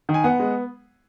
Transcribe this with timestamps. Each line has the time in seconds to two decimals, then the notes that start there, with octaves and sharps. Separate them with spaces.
0.09 D#3
0.14 G#5
0.24 B3 F#5
0.40 G#3